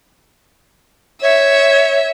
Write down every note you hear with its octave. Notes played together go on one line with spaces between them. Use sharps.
C#5 E5